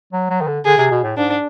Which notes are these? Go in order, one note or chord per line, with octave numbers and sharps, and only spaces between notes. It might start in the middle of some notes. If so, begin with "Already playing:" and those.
F#3
F#3
D#3
D3
D3 G#4
C3
B2
A2
G#2 D4